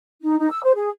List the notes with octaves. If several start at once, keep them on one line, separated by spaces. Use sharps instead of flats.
D#4
D#4
E6
C5
G#4